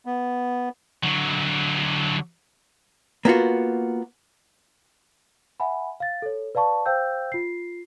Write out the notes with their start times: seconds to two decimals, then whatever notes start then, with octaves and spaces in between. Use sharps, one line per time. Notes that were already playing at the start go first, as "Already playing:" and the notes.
0.06 B3
1.04 D3 F#3
3.25 A#3 B3 F4 F#4
5.60 E5 F#5 G#5 B5
6.00 F5 A6
6.22 A4 C#5
6.55 B4 D5 F5 A5 C#6
6.86 C5 F5 G5 E6 G6
7.32 F4 C7